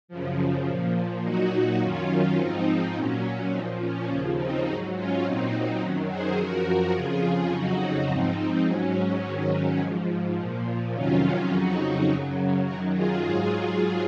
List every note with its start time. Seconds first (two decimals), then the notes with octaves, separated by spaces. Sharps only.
0.08 F#2 C#3 F3
0.65 A#2 F3
1.22 A#2 F#3 D#4 F#4
1.79 F#2 D#3 F#3 C#4 F4
2.37 G#2 F3 C4 D#4
2.94 A#2 F#3 C#4
3.51 A#2 F3 C4 D#4
3.80 C#4
4.08 D#2 C#3 F3 C#4
4.37 C4 D#4
4.65 G#2 F#3 D#4 F#4
4.94 C#4 F4
5.22 A#2 F#3 C4 D#4
5.80 F#2 D#3 F#3 C#4
6.08 G#4 C5
6.37 F#2 F3 F#4 A#4
6.94 F2 C#3 F3 F4 G#4
7.51 F2 C#3 F#3 D#4 F#4
8.08 G#2 F3 C4 D#4
8.65 G#2 F#3 C#4
9.22 G#2 D#3 F#3 C#4
9.80 G#2 F3
10.37 A#2 F3
10.94 F2 C3 D#3 F#3 C#4 F4
11.51 F2 C#3 F#3 D#4 F#4
12.08 F#2 C#3 F#3
12.65 F#2 D#3 F#3 F#4 A#4
12.93 F4 G#4
13.22 G#2 F#3 F4 G#4